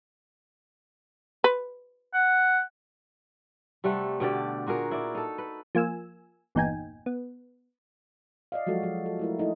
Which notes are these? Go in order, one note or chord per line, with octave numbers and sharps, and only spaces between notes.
B4
F#5
C3 G3 A3 F#5
B2 D3 G4 D5
A#2 F#4 G#4 A#4
E4 D5
D#4 A4
B4
F3 A#3 G#5 E6
G1 E2 A#2 D#4 G5 G#5
B3
D5 D#5 F5
F3 F#3 G#3 F#4 A4
F3 F#4
A4
A3 E4 A#4
A3 D#4 E4 A4